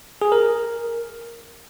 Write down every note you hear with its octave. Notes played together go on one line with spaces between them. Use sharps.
G#4
A#4